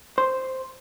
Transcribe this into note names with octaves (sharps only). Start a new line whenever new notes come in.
C5